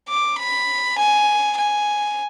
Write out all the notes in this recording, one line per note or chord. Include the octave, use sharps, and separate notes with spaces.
D6
B5
G#5
G#5